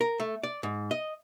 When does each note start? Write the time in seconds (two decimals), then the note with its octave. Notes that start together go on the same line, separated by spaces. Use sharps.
0.01 A#4
0.20 A3
0.43 D5
0.63 G#2
0.91 D#5